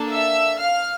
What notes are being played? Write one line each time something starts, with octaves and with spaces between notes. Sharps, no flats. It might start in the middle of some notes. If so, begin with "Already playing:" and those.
Already playing: A#3 D4 A4
E5 E6
F5 F6